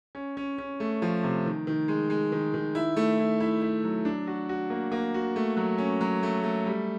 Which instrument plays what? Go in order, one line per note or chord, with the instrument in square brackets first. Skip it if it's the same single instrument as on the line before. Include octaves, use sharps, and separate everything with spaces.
[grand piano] C#4
C#4
C#4
A3
F3
C3
D#3
D#3
G#3
G#3
D#3
D#3
E4
A3
E4
E4
E4
F#3
D4
F#4
F#4
A#3
A#3
F#4
A3
F#3
C#4
F#3
A3
A3
G3